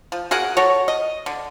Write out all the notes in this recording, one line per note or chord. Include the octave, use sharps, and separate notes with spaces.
F3
F#4 G#4 A#4 F#5
F#4 A4 C#5
D#5
D3